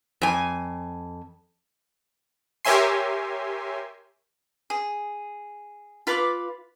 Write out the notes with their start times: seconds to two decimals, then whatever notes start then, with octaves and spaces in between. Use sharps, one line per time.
0.21 F2 G#5
2.65 G4 A#4 C#5 E5 G#5 C6
4.70 G#4
6.07 F4 B4 B5 D6